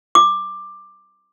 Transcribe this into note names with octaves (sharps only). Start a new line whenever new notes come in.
D6